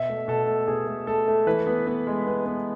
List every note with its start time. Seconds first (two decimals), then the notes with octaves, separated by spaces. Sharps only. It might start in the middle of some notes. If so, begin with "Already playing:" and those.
Already playing: B2 E5
0.09 A3
0.28 B2 A4
0.47 A3
0.67 B2 G#4
0.87 A3
1.07 A3 A4
1.28 A3
1.47 E3 B4
1.67 B3
1.87 B3
2.07 G#3
2.26 B3
2.46 B3